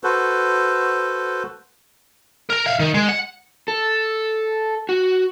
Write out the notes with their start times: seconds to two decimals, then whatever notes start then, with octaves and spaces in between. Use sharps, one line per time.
0.04 F#4 A4 B4 C5
2.50 A#4 A#5
2.66 E5 F5
2.79 D#3
2.94 G#3
3.08 F#5
3.68 A4
4.89 F#4